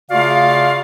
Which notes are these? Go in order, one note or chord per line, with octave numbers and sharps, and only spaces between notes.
C#3 A3 F4 F#4 D5 F5